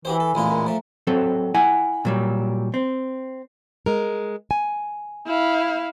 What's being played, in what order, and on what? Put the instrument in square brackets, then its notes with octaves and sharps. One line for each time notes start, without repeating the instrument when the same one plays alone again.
[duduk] E3 [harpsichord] F#4 G4 C5 [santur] G#5
[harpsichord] A4
[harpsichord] A1 E2 F4 [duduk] A#2 [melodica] G#3 E4
[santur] A#4 F#5
[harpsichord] F3 A3
[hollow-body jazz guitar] F#3 C4 A4
E4 F#5 G#5
A#2 F#3 G3
C4
[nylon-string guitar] G#3 A#4
G#5
[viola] E4 F5